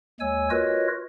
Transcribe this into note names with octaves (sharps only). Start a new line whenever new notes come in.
D#2 G#3 C#5 G#5 E6
F4 F#4 A#4 B4 C#5 D#5